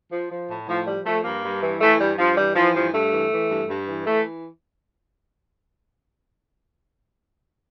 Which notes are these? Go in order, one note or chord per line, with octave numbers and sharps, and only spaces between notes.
F3
F3
A2
A2 F3
F3 G3
F3 A3
G2 A#3
G2
E3
E3 A3
G2 G3
G2 F3
E3 G3
E3 F3
G2 F3
G2 A3
E3
E3
G2
G2
E3
E3 A3